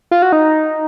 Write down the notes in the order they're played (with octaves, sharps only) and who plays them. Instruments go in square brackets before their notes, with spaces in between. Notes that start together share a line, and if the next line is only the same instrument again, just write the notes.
[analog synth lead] F4
F#4
D#4